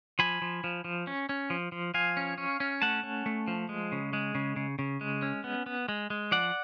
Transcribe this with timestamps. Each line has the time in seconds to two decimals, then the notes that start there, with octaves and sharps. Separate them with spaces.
0.19 F3 G#5 B5
0.42 F3
0.64 F3
0.84 F3
1.07 C#4
1.29 C#4
1.50 F3
1.72 F3
1.94 F3 F5 G#5
2.17 C#4
2.38 C#4
2.60 C#4
2.82 A3 F#5 A5
3.03 C#4
3.26 A3
3.48 F3
3.69 G#3
3.92 C#3
4.13 G#3
4.35 C#3
4.56 C#3
4.79 C#3
5.01 G#3
5.22 C#4
5.44 B3
5.66 B3
5.89 G#3
6.10 G#3
6.31 F3 D5 F#5